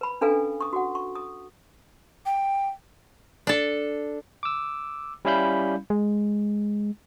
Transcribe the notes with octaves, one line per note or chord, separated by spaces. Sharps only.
B4 B5
C#4 D4 A4 B4 F5 G#5
C#6 D#6
F#4 F#5
C#6
D#6
G5
D4 A4
D6 E6
G3 C#4 E4 F5 B5 G6
G#3